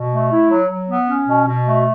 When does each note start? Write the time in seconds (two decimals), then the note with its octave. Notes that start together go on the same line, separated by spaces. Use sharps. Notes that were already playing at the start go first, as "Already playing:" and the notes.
Already playing: B2
0.13 A3
0.32 E4
0.50 F#3
0.70 F#3
0.89 B3
1.08 C#4
1.27 B2
1.47 B2
1.66 A3